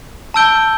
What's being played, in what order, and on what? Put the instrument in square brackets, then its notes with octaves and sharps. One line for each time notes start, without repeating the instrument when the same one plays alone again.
[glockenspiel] A5 E6 G6 D7 G7